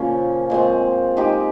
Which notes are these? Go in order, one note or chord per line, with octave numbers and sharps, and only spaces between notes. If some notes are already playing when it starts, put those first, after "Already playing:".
Already playing: A#2 C#3 F3 A#3 C#4
A#2 G#3 C4
G#3 D#4 G4